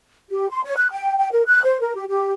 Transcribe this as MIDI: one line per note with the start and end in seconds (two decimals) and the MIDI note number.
0.30 0.49 67
0.50 0.62 84
0.65 0.74 73
0.77 0.91 90
0.91 1.15 79
1.17 1.30 79
1.32 1.44 70
1.47 1.61 90
1.63 1.79 72
1.81 1.95 70
1.96 2.05 67
2.09 2.32 67